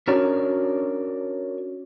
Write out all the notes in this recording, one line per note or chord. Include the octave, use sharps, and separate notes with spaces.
C#4 D4 F#4 A#4 C#5 D5